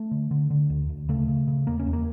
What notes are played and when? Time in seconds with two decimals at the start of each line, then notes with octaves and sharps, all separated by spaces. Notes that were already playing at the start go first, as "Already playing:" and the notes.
Already playing: A3
0.11 D3
0.31 D3
0.50 D3
0.70 D2
0.89 D2
1.09 C#3 A3
1.28 C#3
1.48 C#3
1.67 E2 A#3
1.80 C#4
1.86 E2
1.93 A#3